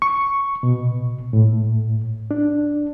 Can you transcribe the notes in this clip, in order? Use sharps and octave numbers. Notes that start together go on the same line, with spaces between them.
C#6
B2
A2
D4